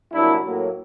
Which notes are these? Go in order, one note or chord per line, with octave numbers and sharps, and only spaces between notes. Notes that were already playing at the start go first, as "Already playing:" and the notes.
C2 A#2 F#3 A#3 D4 E4
A2 F#3 A#3